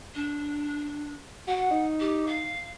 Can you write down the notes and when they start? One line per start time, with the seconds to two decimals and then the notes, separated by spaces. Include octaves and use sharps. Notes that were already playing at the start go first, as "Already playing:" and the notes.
0.14 D4
1.47 F#4 F#5
1.71 D#4
1.99 G4
2.26 F5